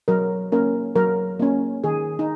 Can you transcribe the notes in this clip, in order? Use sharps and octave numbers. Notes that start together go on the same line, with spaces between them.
F#3 A#4
A#3 C#4 A#4
F#3 A#4
A#3 C#4
D#3 G#4
D#4